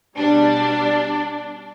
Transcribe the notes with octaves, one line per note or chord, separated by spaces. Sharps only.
B2 G3 D4